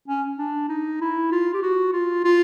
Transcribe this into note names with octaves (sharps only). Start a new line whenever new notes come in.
C#4
D4
D#4
E4
F4
G4
F#4
F4
F4